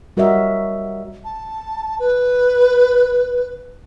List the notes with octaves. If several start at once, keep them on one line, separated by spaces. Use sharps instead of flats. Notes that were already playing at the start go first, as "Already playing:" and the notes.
G3 F#4 A#4 C#5 D#5 E5
A5
B4